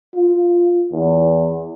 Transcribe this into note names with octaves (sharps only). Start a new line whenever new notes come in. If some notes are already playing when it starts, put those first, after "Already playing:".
F4
E2